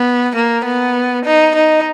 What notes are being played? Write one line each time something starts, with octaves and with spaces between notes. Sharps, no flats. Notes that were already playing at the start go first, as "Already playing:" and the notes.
Already playing: B3
A#3
B3
D#4
D#4